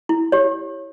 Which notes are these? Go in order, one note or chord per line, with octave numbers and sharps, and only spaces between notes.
E4
G4 C#5